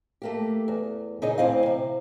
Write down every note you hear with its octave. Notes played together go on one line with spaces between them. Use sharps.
A3 A#3 G4
E2
A#2 C#3 D#4 G#4 D#5
D2 E3 C4 D#5 F5
C3